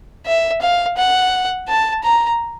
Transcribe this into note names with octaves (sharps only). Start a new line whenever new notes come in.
E5
F5
F#5
A5
A#5